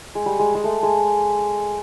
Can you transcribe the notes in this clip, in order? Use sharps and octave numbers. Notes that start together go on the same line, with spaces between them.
G#3
G3
G#3
G#3
A3
G#3